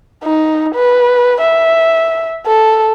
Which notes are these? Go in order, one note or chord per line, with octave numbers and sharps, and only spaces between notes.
D#4
B4
E5
A4